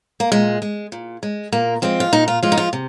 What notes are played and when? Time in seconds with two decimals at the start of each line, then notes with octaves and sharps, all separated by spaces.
0.20 A#3
0.32 A#2 G#3
0.62 G#3
0.92 A#2
1.23 G#3
1.52 A#2 A#3
1.82 F3 G#3 C4
2.00 F4
2.13 A#2 D#4
2.28 F4
2.43 F3 G#3 F4
2.52 D#4
2.58 F4
2.73 C3